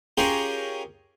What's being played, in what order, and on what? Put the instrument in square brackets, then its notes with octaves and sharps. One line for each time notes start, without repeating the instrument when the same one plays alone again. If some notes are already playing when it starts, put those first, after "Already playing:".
[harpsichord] C#4 F4 G4 G#4 A#4